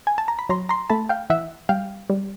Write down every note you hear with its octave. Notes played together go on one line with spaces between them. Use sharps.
G#5
A5
A#5
B5
F#3 A#5 C6
A#5 C6
A3 A5 B5
F5 G5
E3 E5 F#5
G3 F5 G5
G3